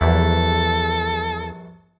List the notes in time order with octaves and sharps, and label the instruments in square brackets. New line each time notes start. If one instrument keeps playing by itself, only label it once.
[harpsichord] A#1 G2 E4 [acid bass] E2 [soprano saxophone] A4